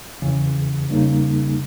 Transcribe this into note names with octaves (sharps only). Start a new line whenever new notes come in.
E2 C#3 E3
E2 C#3 G3 A#3 D#4